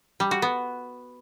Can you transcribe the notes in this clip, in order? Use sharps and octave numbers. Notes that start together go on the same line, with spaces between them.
G3
F#4
B3